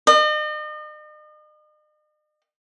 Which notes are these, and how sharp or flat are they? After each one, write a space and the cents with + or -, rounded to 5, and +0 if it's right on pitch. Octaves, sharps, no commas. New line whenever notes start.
D#5 -40